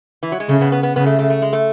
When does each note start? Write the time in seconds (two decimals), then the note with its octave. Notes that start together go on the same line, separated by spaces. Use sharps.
0.23 E3
0.32 F#3
0.40 G#3
0.49 C#3 A3
0.61 B3
0.72 B3
0.83 B3
0.95 C#3 B3
1.06 A3
1.19 A3
1.30 A3
1.42 G#3
1.53 A3